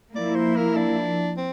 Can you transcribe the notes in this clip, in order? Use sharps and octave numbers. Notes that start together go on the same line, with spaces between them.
F3 A#3 E4 D5
C5
A#4
D4
C4